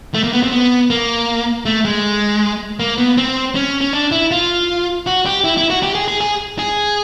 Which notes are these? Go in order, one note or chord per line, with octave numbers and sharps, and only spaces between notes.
A3
A#3
B3
C4
B3
A#3
A3
G#3
A#3
B3
C4
C#4
C#4
D4
E4
F4
F#4
G4
E4
E4
F#4
G4
G#4
G#4
G#4
G#4